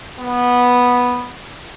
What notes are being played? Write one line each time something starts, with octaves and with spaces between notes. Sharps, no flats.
B3